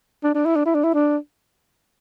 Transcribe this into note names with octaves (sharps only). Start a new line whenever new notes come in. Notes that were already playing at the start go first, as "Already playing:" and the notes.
D4
D4
E4
D4
E4
D4
E4
D4